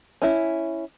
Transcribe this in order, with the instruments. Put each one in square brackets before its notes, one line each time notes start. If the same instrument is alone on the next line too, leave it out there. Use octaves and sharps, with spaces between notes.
[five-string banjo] C#4 E4